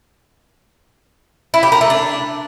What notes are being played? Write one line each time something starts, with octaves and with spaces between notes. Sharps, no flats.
E4
G4
A#4
A3
D4